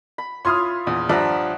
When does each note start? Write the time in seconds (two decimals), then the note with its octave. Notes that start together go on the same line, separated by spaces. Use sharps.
0.18 B5
0.45 E4 F4 C#5 C6 D#6 F6
0.87 A#1 E2 D#6
1.09 G2 F3 D5 E5 F#5 A#5